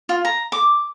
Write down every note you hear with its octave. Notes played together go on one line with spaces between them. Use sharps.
F4
A#5
D6